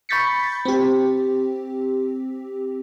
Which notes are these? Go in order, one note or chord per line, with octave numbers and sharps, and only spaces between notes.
B5 C#6 G6 A6 B6 C#7
C4 G4